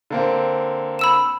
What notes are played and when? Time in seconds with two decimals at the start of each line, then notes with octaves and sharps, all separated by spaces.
0.11 D3 A#3 C4
0.99 B5 E6 E7